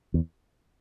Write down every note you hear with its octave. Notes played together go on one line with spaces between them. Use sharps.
E2